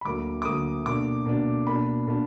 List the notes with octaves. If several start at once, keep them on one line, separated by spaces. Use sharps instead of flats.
B5
D2 D3 F#3 A#3 D6
D6
D2 D3 F#3 A#3 D#6
B2 A#3 D4 D6
B2 A#3 D4
B2 A#3 D4 B5
B2 A#3 D4